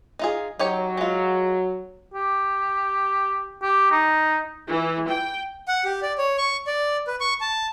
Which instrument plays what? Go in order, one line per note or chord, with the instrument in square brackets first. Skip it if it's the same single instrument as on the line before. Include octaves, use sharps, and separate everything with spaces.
[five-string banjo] D#4 F4 G#4
[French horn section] F#3 [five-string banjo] D#4 G4 C#5
[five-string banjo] G#3 F4
[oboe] G4
G4
D#4
[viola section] E3
G5
[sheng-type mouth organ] F#5
G4
D5
C#5
C#6
D5
B4
C#6
A5